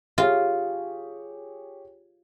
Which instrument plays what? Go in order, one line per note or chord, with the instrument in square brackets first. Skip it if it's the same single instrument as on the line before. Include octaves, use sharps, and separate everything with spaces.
[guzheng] F4 [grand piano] G4 G#4 C#5